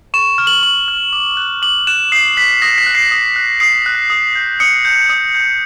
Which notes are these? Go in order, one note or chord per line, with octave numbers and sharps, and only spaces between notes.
C#6 E7
F6
F#7
C#6 F#7
F6
D6
F#6
D6 F#7
F#6 E7
D#6 C7
F#6 B6
D#6 A#6
B6
F#6
C7
D#6
F#6
D#6 C7
F#6
D#6
G6
D#6 C#7
G6
D#6
G6